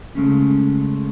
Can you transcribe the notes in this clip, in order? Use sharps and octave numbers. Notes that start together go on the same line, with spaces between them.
C#3 G#3 A3 C#4